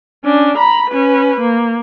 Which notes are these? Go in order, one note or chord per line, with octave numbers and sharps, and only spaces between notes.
C#4 D4
A#5 B5
C#4 B4
A#3